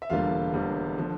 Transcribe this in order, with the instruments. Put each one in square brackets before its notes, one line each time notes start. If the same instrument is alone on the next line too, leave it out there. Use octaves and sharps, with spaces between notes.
[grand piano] E5
E1 E2 D3 G3 A#3 F4 F5
E1 E2 D3 G3 A#3
D3 F3